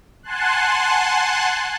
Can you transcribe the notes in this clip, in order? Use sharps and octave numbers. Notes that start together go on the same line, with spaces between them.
F#5 G#5 A5 C6 F#6